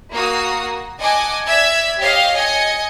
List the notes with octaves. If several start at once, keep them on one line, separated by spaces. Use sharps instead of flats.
A#3 F#4 D#6
D#5 F#5 G#5 A5 D6
D5 E5 E6 G#6 B6
G4 C#5 D#5 F5
D#5 G#5 C#7